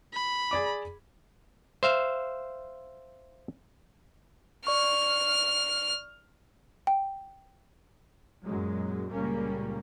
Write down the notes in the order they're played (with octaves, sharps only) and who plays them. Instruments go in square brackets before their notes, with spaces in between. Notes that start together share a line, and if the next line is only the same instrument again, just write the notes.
[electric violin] B5
[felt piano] G#4 D5 D6
[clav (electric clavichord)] C5 E5 F5
[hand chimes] D5 C#6 [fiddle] F6
[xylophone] G5
[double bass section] F#2 A#2 F#3 G#3
C#2 A#2 G3 A#3 C#4